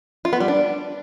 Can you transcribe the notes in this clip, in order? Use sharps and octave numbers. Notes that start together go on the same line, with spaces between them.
F4
B3
G3
D4